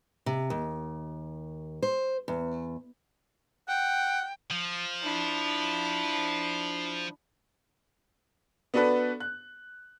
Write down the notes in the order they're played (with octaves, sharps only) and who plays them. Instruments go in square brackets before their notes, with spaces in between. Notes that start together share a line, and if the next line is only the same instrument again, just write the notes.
[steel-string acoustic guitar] C3
D#2
C5
E2
[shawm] F#5 [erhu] G5
[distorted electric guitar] F3
[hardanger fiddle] D4 E4
[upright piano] B3 D4 F#4 A4 B4
F#6